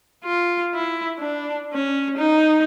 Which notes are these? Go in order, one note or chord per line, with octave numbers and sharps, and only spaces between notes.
F4
E4
D4
C#4
D#4